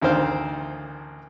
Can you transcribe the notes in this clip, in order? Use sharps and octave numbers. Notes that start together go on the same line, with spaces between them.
A1 D2 D#3 C5 F5